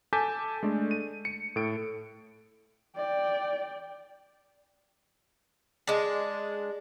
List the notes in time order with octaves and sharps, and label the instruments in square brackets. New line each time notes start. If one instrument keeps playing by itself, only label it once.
[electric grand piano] A4 G#5 A5 D6 G6 B6
G#3 A3 D4
D#7
C#7
A2 A4 D7
[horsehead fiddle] D5 G5
[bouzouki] G#3 D4